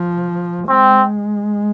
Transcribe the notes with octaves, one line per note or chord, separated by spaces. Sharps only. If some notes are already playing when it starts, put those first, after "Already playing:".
Already playing: F3
G#3 C4